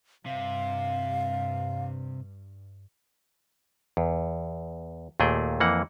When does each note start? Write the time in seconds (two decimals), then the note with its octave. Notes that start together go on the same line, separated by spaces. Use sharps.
0.26 G2 C3 F5
3.97 E2
5.20 D#2 A#2 A3 G#4 G5
5.60 F2 E3 A#3 F#5